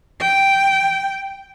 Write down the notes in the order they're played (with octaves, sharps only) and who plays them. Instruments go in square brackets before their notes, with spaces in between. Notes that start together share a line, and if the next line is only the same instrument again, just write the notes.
[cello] G5